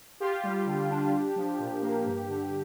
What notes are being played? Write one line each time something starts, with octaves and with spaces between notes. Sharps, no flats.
F4 G4
G3 G4
D3
D4
D4
F3
A#2
A#3
G2
D3